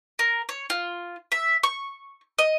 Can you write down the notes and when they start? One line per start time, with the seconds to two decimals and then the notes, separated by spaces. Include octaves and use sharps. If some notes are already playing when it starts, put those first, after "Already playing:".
0.19 A#4
0.49 C#5
0.70 F4
1.32 E5
1.63 C#6
2.38 D#5